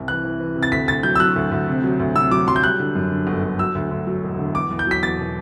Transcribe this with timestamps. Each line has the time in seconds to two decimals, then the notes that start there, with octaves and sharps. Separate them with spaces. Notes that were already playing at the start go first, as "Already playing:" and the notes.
Already playing: C2 C3
0.08 E3 F#6
0.24 E3
0.40 E3
0.56 C3
0.63 A6
0.72 D2 B6
0.88 D2 A6
1.03 F#3 G6
1.15 E6
1.20 F#3 F#6
1.36 D2
1.51 D2
1.68 C3
1.84 F#3
2.00 D2
2.16 C3 E6
2.31 F#3 D6
2.48 F#3 C6
2.56 G6
2.63 G3 F#6
2.79 D3
2.95 F#2
3.11 D3
3.27 G1
3.43 G1
3.59 F#3 E6
3.75 D2
3.91 D2
4.07 F#3
4.23 E1
4.38 D3
4.55 E2 D6
4.71 E2
4.79 G6
4.87 F#3 B6
5.03 E2 A6
5.18 B2